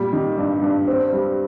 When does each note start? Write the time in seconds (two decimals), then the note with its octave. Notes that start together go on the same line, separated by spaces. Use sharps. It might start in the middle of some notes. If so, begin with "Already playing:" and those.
Already playing: A#2 G3
0.13 D#3
0.38 G2
0.62 G2
0.88 C4
1.13 G3